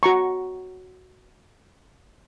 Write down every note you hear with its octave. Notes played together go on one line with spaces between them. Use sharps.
F#4 A#5 C#6